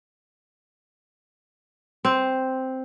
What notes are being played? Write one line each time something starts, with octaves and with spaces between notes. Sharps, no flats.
C4